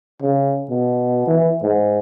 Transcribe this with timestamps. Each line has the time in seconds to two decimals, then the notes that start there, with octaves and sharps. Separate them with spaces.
0.22 C#3
0.70 B2
1.27 E3
1.62 G#2